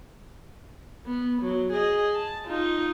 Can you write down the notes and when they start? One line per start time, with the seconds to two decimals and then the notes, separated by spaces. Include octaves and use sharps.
1.06 B3
1.42 F#3
1.73 G#4 D#5
2.15 A5
2.45 D#4 F4